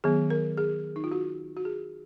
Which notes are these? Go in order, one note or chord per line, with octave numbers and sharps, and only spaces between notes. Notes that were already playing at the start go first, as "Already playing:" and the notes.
D#3 F#3 B3 G#4
A#4
G#4
D#4
F4
F#4
F#4
G#4